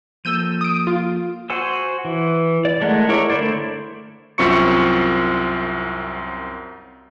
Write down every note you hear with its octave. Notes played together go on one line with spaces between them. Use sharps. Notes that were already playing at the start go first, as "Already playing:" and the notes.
F3 A#3 A4 E6 G6 D#7
D#6 D7
F4
F#4 C5 G#5 E6
E3
D5
G#3 A3 A#4 F#5
E4 A#4 C#5 D5
D3 A3 E4 C5 D5
C2 F#2 C4 F4 C#6 C#7